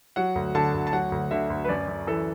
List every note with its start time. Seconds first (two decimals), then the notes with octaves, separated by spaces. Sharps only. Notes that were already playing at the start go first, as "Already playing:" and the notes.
0.16 F#3 F#5
0.35 D2
0.55 D3 A5
0.74 D2
0.87 A5
0.92 F#3 F#5
1.12 D2
1.31 D3 E5
1.50 D2
1.64 B4
1.69 F#2 D5
1.88 F#2
2.07 E3 A4